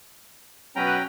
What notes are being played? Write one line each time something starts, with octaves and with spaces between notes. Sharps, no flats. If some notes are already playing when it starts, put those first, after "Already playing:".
B2 F#3 C#4 B4 G5 A#5